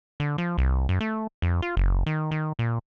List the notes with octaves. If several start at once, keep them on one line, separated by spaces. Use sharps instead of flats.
D3
F3
C2
F#2
A3
F2
F4
F#1
D#3
D#3
A#2